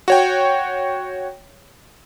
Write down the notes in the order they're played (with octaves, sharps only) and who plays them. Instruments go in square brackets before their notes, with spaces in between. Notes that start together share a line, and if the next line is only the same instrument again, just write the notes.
[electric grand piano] F#4 C#5 G5